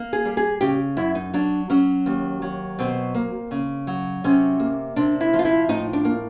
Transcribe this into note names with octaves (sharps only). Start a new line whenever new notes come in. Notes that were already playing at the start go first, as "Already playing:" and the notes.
Already playing: A#3
G#4
G3
G#4
C#3 G4
F#2 E4
D#4
F#3 D4
F#3 C#4
D#2
F#3
B2 C4
A#3
C#3
F#3
C3 C#4
A#3
C3 D4
E4
F3
F4
E4
A2 D#4
D4
A#3